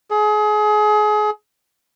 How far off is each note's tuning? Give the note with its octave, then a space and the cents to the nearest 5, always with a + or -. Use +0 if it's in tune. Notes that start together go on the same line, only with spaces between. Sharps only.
G#4 +30